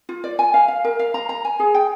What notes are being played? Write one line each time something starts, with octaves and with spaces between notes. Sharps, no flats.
F4
D5
G#5
F5
F5
A#4
F5
A#5
A#5
G#5
G#4
G5